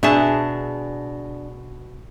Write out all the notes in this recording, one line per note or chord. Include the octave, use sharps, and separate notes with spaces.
B2 D4 G#4 E5 A5